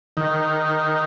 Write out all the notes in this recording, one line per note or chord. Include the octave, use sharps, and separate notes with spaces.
D#3